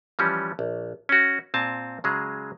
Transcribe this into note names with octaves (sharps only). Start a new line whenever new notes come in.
E3 F3 G3 C#4
A#1
C#4 F#4
A#2 C4 G#5 A5
C#3 F#3 G#3 G#4